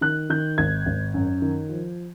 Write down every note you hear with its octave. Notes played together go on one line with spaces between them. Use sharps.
D#3 F#6
D#3 G6
G#1 G#6
G#1
F#2
D#3
F3